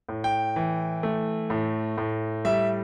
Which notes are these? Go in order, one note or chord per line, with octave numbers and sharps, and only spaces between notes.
A2
G5
E3
A3
A2
A2
G3 E5